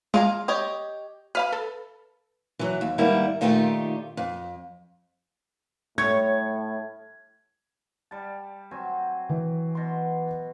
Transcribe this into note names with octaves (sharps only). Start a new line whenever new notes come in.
G#3 F4 F5 A#5
G4 C#5 D#5
B4 F5 B5 F6 B6
A4
E3 F#3
D#2
G#2 D#3 G3 A#3 B3 E4
A#2 D#3 A3 D#4 F4 G4
F2
A2 C#5 G#6
G3 A5
F#3 C4 G#5
E3
B2 C6